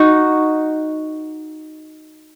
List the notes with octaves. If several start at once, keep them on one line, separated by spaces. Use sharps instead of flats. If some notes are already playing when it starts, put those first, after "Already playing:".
Already playing: D#4 F#4